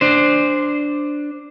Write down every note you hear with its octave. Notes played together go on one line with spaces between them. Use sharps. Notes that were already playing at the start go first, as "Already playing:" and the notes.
D4 C5